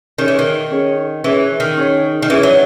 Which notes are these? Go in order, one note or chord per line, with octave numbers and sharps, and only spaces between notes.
D#3 C#4 G#4 C#5
E3
D#3
C#4 G#4 C#5
E3 C#4 G#4 C#5
D#3
C#4 G#4 C#5
D#3
E3 C#4 E4 G#4 C#5
F#3